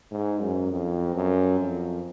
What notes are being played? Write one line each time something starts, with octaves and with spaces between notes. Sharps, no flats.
G#2
F#2
F2
F#2
F2